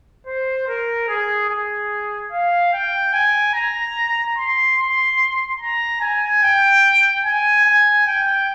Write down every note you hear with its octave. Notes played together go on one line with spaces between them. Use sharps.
C5
A#4
G#4
G#4
F5
G5
G#5
A#5
C6
C6
A#5
G#5
G5
G#5
G#5
G5